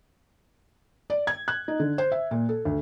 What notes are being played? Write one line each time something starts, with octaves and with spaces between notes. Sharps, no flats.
D5
G#6
F#6
D#4
D3
C5
E5
A#2
A4
D2